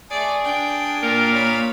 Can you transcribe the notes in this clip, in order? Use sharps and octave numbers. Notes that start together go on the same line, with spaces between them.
A3 G#4 D5
D4 G5
A#2 A#3 A#4 F5
C#5 B5